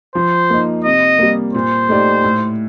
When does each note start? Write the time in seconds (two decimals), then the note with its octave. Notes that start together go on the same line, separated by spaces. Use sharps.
0.15 F3 C5
0.50 A#3 D#4
0.84 C3 D#5
1.19 G3 A#3
1.54 A#2 C5
1.89 A3 D#4 G4 D5
2.24 A2